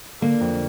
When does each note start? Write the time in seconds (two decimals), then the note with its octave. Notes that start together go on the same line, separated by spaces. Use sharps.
0.21 D3 A#3
0.41 F2